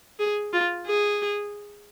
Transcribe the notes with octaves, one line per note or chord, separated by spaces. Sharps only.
G#4
F4
G#4